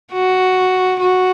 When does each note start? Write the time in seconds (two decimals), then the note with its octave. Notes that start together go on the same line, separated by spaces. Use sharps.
0.13 F#4
1.00 F#4